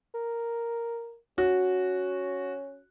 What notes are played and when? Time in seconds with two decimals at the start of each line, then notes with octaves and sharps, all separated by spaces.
0.14 A#4
1.38 C#4 F#4